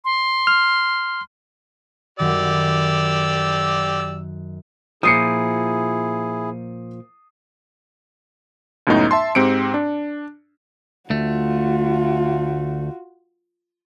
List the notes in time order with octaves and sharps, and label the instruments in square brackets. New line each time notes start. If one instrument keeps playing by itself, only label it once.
[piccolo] C6
[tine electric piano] F6
[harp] F#2 D#3 [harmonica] G4 D5 E6
[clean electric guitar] A#2 F3 [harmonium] E4 G#4 [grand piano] D#6 C7 C#7
[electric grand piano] C#2 F#2 A2 B3 D#4
E5 A5 C6
G#2 C4 G4 C#7 D7
D4
[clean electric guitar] D2 A3 [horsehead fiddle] F4 F#4